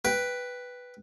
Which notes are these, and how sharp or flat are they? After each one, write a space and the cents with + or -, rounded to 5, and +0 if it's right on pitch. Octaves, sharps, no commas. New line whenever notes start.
B4 +0 G5 +5